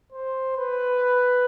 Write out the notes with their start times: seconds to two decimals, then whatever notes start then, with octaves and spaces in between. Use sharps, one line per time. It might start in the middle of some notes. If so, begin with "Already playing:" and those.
0.12 C5
0.57 B4